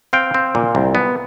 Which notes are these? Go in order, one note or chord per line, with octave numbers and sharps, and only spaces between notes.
C4 F5 G5
C4
A#2
C2
B3